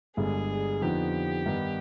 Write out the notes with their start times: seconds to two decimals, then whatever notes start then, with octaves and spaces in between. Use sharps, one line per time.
0.17 G1 G2 D3 G#3 G#4
0.81 F2 D3 F3 B3 D#4 G4
1.46 G2 D#3 B3 D#4